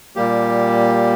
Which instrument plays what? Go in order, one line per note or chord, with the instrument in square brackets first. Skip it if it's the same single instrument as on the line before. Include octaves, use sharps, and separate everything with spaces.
[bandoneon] A#2 G3 A#3 G4